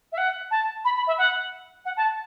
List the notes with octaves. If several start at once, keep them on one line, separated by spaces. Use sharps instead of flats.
E5
F#5
A5
B5
B5
E5
F#5
F#5
A5